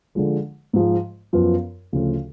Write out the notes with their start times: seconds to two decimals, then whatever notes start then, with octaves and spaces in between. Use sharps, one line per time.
0.15 D3 F3 G#3
0.73 G#2 F3 G#3
1.33 F#2 F3 B3 F4
1.93 D2 C#3 F3 A3 F4